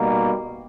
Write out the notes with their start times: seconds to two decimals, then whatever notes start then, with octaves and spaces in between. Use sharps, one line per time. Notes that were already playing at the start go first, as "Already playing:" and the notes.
Already playing: B2 G3 A#3 D#4 F#4